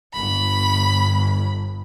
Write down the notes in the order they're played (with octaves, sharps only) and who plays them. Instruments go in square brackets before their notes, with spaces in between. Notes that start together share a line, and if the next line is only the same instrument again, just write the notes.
[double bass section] G1 [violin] B5